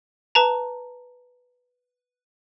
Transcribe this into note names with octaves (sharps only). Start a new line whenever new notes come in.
B4 A5 A#5